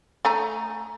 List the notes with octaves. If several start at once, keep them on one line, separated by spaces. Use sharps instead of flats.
A3 G#5 A#5